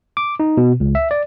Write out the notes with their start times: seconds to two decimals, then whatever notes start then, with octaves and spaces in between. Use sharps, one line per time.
0.17 D6
0.40 D#4
0.57 B2
0.80 C#2
0.95 E5
1.11 D5